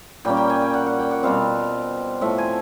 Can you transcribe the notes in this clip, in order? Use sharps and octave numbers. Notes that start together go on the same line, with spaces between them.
A#2 G3 A#3 C#4 G5
G5
G#5
G5
F#5
F#5
G5
F#5
B2 G3 C4 F5
A2 F3 A3 E5
G#5